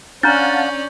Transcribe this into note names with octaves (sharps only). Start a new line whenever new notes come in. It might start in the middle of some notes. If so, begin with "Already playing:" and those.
C#4 D4 D5 F5 F#5 A5 A#5 G6